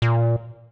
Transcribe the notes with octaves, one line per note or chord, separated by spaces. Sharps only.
A#2